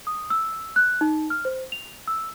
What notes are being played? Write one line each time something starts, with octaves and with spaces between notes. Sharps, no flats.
D#6
E6
F#6
D#4
F6
C5
F7
E6